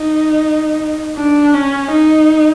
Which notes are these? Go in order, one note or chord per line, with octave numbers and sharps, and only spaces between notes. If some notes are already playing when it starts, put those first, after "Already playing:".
Already playing: D#4
D4
C#4
D#4